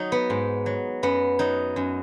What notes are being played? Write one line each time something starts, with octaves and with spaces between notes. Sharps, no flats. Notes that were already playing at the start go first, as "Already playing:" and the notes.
Already playing: F#3 D#4
B3
G#2
F#3
F#2 B3
F#3 D#4
F#2